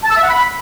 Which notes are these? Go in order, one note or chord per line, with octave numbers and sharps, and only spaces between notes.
A5
E6
E5
F#5
B5